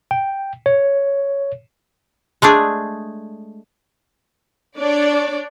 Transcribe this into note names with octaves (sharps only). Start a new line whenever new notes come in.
G5
C#5
G#3 A3 D4 G#4
D4 C#5 D5